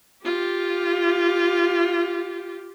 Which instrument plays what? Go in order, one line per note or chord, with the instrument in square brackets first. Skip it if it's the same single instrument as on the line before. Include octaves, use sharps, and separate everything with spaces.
[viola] F4 G4